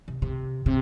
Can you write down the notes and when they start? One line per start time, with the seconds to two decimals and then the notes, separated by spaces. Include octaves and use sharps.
0.08 C3
0.22 C3
0.66 C3